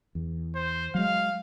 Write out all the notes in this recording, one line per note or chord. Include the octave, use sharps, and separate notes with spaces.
E2
C5
F#3 G#3 F5